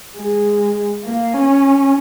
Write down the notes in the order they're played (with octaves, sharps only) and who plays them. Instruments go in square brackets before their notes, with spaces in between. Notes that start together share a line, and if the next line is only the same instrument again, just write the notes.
[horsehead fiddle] G#3
A#3
C#4